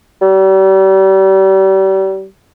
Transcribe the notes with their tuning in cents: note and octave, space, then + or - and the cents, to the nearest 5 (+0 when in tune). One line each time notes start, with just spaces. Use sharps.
G3 -35